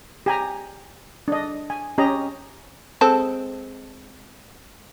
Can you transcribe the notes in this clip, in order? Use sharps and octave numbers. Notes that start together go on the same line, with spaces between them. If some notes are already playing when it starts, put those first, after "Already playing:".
G4 G#5 A#5
D4 D#5
G#5
C#4 G4 D#5 A#5
G#3 C4 A4